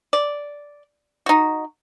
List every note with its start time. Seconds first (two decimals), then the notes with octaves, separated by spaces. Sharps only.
0.13 D5
1.26 D#4 F#4